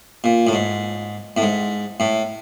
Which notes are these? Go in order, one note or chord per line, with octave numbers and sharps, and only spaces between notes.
A#2
A2
G#2
A2
G#2
A2